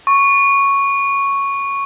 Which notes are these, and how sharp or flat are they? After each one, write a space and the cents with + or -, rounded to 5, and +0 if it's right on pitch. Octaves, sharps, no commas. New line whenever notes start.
C#6 +0